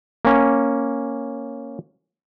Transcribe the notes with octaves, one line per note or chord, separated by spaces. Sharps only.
A#3 C#4